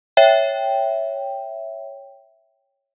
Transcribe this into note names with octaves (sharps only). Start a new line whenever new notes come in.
C#5 E5 G5